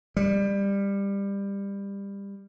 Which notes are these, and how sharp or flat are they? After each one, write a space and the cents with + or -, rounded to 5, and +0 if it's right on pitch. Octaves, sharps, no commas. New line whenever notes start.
G3 +20